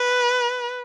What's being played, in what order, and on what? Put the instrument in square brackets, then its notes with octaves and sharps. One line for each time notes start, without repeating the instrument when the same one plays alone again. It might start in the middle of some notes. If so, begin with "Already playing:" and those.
Already playing: [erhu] B4